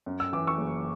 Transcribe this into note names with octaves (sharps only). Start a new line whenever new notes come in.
F#2
E6
E3 D6
C#6 E6
F#1